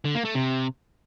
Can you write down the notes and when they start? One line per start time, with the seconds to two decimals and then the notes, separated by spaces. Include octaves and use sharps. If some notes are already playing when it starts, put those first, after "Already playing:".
0.05 D3
0.15 A#3
0.25 A3
0.35 C3